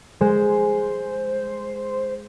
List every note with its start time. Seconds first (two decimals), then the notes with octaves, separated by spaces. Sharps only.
0.21 G#3 C5